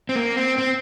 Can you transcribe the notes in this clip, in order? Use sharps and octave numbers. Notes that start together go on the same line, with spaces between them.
C4
A#3
C4
C4